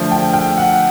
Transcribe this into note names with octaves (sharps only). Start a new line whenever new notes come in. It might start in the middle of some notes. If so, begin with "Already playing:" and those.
Already playing: D3 F3 A3
G5
G5
F#5